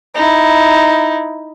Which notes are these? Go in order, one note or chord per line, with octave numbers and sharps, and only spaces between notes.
D#4 E4